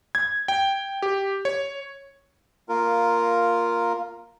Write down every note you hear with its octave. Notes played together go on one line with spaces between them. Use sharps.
G#6
G5
G4
C#5
A#3 F4 A#4